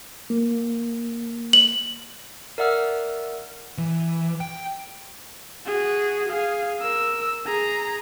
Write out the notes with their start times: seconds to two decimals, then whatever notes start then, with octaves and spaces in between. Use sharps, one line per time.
0.30 A#3
1.53 F#7
2.58 A#4 D5 E5 F#5 E6 F6
3.78 E3
4.41 G5
5.67 F#4 G#4
6.29 G#4 F5
6.81 A#4 E6
7.46 G#4 A#5